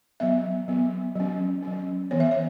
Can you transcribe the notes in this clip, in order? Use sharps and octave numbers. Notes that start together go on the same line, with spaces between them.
F#3 B3 E5
F#3 B3
F#3 C#4
F#3 C#4
E3 B3 C#5
E5
C#5